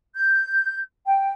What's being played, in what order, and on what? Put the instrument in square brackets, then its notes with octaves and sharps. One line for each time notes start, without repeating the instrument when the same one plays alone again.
[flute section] G6
G5